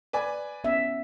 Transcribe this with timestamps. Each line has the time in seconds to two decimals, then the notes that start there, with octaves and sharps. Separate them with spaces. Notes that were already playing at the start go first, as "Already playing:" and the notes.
0.13 B4 D5 G#5
0.64 B3 C#4 E5